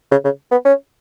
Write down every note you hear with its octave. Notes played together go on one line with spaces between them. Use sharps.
C#3
C#3
B3
C#4